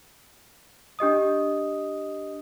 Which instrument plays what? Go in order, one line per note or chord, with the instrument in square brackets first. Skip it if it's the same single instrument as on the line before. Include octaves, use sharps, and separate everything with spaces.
[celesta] D4 G4 D#5 D#6